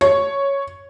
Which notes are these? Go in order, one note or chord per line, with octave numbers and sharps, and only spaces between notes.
C#5